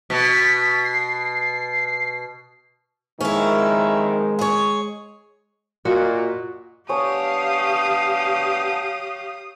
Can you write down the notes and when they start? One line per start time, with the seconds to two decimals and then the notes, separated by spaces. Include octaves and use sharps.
0.10 B2 B6
0.84 C7
3.21 F2 A#2 D#3 G#3 C#4 E4
4.39 G#4 C#5
5.85 A#2 F4 F#4 A#4 D#5
6.89 B3 D4 G4 C#5 F5 G#5 D#6